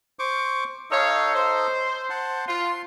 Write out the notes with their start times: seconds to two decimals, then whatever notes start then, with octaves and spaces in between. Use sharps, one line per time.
0.19 C5 C#6 D6
0.91 D#4 A4 C#5 D#5 F5
1.34 C5
2.10 C5 F#5 A5
2.48 F4 C6